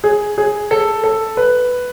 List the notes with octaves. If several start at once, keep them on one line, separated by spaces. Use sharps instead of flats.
G#4
G#4
A4
A4
B4